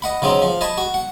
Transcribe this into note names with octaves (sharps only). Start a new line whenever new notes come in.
D#5 F#5 B5
C#3 F#3 C4 D#4
F3
D#5 G#5 A5 B5
F#4
F#5